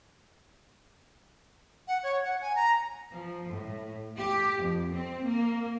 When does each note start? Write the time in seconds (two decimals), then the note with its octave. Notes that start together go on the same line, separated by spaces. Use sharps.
1.88 F#5
2.03 C#5
2.24 F#5
2.42 G#5
2.55 A#5
3.13 F3
3.51 A2
4.19 G4
4.62 F2
4.93 C4
5.27 A#3